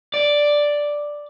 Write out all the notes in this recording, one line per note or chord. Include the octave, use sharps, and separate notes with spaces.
D5